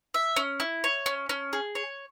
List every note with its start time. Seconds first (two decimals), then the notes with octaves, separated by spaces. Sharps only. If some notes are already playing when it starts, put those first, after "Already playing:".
0.14 E5
0.36 C#4
0.60 E4
0.84 C#5
1.06 C#4
1.29 C#4
1.53 G#4
1.75 C#5